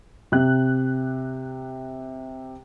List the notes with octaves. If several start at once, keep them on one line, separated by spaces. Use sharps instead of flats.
C3 F#6